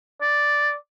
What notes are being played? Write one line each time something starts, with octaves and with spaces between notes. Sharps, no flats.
D5